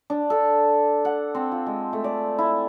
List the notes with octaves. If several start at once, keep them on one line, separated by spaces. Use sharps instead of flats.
D4
A4
F#5
C4
F4
G#3
A3
D5
E4